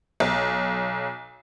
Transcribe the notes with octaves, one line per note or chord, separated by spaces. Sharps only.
B1